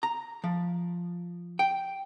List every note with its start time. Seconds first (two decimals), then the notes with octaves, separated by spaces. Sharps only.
0.03 A#5
0.44 F3
1.59 G5